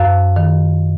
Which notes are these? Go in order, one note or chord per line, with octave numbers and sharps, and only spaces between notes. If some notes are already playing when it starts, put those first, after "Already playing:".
Already playing: F#2 F5
D#3